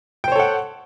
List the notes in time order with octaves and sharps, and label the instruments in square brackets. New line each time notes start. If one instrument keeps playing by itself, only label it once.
[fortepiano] G5
C5
C#5
A4
F#5